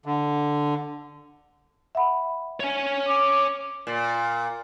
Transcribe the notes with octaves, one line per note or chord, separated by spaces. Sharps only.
D3
E5 F#5 B5
C#5 G#5
D6
A#2